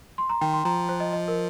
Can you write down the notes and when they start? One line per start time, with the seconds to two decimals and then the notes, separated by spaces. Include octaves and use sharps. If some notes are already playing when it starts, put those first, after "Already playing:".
0.18 C6
0.30 A#5
0.41 D#3 G5
0.54 C6
0.65 F3 A#5
0.89 C5
1.00 D#5
1.13 D#5
1.28 A#4